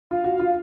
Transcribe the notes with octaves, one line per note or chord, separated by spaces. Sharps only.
F4 F5
F#4
F4